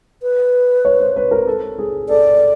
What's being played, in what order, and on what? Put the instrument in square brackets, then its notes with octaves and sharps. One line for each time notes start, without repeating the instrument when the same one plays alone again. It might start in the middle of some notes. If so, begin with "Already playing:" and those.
[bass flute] B4
[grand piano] C#5
C5
B4
A#4
A4
G#4
[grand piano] A4 [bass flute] D5